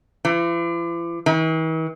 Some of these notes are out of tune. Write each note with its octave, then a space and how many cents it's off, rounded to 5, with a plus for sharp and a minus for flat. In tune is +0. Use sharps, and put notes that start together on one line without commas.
E3 +45
E3 -45